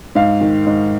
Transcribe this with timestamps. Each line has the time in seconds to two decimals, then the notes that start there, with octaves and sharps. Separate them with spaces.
0.15 G#2 F5
0.41 D#3
0.66 G#2